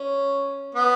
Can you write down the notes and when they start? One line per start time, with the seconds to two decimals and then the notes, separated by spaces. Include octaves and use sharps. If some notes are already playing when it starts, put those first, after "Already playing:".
Already playing: C#4
0.75 B3